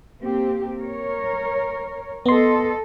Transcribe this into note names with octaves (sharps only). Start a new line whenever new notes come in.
A#3 C4 G4
A#4 C#5
B3 A4 D#5 C6